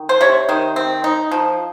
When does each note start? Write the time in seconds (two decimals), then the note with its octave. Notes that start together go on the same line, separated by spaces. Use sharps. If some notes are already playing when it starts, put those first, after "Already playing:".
Already playing: D#3
0.09 C5
0.21 C3 C#5
0.49 D#3 C5
0.76 C4
1.04 D#4
1.31 F3